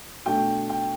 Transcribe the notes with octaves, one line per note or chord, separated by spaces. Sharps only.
B2 A3 D4 G5
G5